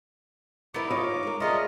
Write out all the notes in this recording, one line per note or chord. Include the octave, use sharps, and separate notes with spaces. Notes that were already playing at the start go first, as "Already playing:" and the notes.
B3 D#4 E4 A#4 C5 D6
F4 C#5 D#5 F5
G#3 C4 A#4
C#3 A3 C#4 F4 G#4 A#4 D#5